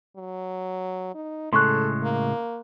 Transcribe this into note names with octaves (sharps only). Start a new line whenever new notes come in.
F#3
D#4
A2 C#3 G#3 A4 C6 C#6 F#6
A#3